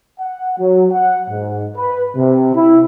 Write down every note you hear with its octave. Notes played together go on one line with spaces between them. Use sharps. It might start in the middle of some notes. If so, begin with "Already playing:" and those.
F#5
F#3
F#5
G#2
B4
C3
E4